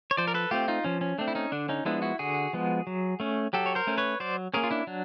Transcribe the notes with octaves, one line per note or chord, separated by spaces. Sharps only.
C#5
F3 C5 D5
A#4
A4 B4
A3 C4 F4 G4
D#4 F4
F3 C#4
C#4
A3 C4 D4
E4
C#4 D#4
D3 D4
C#4 D#4
F3 G#3 B3 D4 E4
E4 F#4
D3 F#4 G#4
F3 G#3 B3
F#3
A3 C#4
F#3 G4 A4
C#5
A#4 C5
A3 C#4
B4 C#5
F#3 C5 D5
A#3 C#4 G#4 A#4
F4
D4 E4
F#3 D4